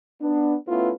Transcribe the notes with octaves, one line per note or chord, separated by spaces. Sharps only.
B3 D4
A3 B3 C#4 E4 F4 B4